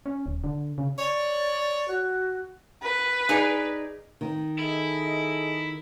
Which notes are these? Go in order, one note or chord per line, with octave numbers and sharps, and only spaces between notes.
C#4
D1
D3
C#3
C#5 D5
F#4
B4
D#4 G#4 D5
D#3
E4 G#4 A4 D#5